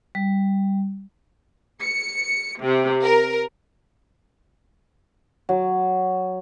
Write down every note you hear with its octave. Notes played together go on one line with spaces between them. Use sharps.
G3
C#7
C3
A#4
F#3